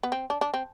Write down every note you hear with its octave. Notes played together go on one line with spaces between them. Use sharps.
B3
C4
D4
D4
C4